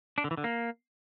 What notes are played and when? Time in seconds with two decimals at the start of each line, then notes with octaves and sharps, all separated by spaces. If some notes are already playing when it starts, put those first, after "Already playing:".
0.18 D4
0.24 D3
0.31 E3
0.37 D3
0.44 A#3